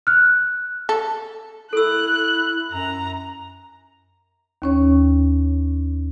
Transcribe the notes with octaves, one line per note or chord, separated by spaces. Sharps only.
F6 F#6
A4
E4 A4 E6 F#6
F#2 A#5
D#2 C#4 C#5